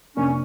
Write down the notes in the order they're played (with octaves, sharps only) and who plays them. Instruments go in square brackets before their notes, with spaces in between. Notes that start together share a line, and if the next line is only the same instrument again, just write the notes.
[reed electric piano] F2 C3 F3 A#3 D4 [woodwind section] C#4